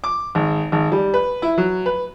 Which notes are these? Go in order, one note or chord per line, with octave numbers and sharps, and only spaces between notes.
D6
G#1
G#1
G3
B4
E4
F#3
B4